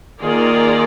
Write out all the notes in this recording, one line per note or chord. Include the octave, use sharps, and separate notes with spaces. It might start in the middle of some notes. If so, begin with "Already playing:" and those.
D#3 A#3 F4 G#4 D5